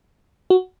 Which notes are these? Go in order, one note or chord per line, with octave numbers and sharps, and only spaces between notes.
F#4